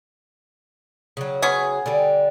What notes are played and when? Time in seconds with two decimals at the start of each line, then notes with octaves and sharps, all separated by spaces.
1.17 C#3 F#3
1.42 B3 C#4 G#4
1.86 D3 G3